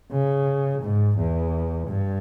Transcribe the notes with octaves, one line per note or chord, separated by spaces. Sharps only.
C#3
G#2
E2
G2